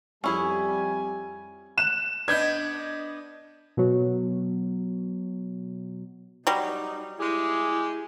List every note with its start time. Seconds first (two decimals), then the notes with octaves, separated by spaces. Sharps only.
0.24 F2 G3 C#4 E4 G#4 G#5
1.78 F#6 E7
2.28 B3 D4 D#5 G6 G#6
3.77 B2 F#3
6.47 F#3 G3 D#4
7.20 G#3 E4 G4 G#4